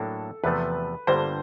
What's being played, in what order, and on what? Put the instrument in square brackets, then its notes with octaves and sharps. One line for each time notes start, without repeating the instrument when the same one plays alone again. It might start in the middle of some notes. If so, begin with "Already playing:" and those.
Already playing: [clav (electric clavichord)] A2 F#3 A#3 D4 [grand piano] A4
[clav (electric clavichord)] E2 C3 F3 A3 [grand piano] B4
[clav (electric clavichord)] G1 G2 D3 G3 A#3 [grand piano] C5